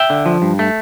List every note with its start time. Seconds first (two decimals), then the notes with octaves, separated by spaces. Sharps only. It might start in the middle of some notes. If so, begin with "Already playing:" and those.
Already playing: E5 G5
0.10 D3
0.26 F3
0.42 G2
0.59 A3